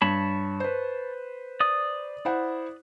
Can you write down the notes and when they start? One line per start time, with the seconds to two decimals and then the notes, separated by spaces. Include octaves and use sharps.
0.02 G2 C#5 A5 B5
0.60 B4 C5
1.60 D5 D#6
2.25 E4 C5 F#5